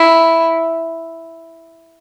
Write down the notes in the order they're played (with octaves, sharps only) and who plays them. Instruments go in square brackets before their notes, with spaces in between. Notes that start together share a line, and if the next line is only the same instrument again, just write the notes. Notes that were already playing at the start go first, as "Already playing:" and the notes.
Already playing: [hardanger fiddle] E4